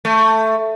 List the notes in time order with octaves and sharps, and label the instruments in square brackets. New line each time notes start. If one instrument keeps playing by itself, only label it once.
[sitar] A3